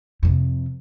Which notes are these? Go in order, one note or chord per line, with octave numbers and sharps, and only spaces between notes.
F2 C3